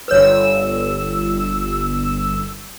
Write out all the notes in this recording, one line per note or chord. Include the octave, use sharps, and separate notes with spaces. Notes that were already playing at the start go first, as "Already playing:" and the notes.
G1 B4 C#5 E6